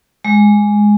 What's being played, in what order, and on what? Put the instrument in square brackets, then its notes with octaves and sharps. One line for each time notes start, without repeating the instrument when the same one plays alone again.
[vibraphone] G#3